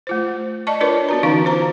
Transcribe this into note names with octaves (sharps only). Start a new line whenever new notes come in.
A3 F4 C5
D5 D#5 A5 C#6
D4 F4 A#4 B4 C#5 D5
B3 F#4 A#5
D3 E3 C#4 D#4 F5 C#6
F4 C5 A#5